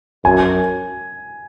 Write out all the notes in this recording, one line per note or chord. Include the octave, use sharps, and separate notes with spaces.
F#2 G#5